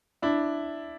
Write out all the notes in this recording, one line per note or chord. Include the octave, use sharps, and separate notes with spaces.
D4 E4